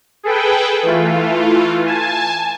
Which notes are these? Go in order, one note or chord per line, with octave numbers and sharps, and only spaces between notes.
G#4 A4 B4 G5
E3 A3 F4
G#5 A5